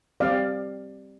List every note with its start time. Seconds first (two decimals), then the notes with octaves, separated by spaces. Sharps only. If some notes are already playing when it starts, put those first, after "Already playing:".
0.20 G3 C4 G4 D5 F5